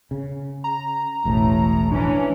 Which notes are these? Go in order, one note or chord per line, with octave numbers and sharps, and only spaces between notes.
C#3
A#5
E1 A1 A2
E3 C#4 D4